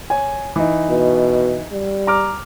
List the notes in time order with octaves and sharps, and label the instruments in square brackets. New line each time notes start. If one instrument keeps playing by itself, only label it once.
[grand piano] C#5 G#5
E3 D#4
[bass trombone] B2
G3
[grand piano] A#5 D6 F6